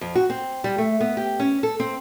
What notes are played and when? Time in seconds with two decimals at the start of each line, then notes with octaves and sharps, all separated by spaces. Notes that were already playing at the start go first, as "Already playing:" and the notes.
0.01 F2
0.15 F#4
0.30 C4
0.64 G3
0.78 A3
1.01 B3
1.17 G4
1.40 C#4
1.63 A4
1.80 C4